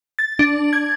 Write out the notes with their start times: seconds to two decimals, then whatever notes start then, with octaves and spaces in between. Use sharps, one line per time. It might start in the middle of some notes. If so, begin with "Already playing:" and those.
0.19 A6
0.39 D4
0.73 G#6